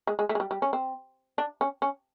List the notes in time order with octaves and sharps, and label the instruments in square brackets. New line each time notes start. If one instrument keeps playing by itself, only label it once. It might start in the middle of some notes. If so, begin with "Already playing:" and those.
[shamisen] G#3
G#3
A3
G#3
G3
G3
C#4
C4
D4
C#4
C#4